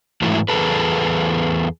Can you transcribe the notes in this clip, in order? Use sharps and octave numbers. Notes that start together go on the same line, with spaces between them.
G#2 E3 F#3 A3 E4
E2 C#3 G#4 A4 B4